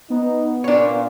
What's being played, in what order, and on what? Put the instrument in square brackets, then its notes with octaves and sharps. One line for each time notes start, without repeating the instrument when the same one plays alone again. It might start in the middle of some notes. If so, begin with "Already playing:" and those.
[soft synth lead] B3 [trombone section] D#4
[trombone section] A#2 [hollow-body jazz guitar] D4 C#5